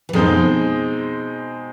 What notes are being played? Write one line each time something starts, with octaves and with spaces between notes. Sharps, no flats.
E3
F2 B2 F3 G#3 C4 D#4